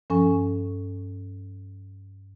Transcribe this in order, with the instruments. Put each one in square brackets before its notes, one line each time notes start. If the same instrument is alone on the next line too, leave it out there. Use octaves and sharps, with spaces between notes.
[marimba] G2 F3 C#4 A4 G#5 C#6